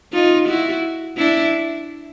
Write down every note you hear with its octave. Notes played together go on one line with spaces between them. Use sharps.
D#4 F4
E4 F#4
D4 E4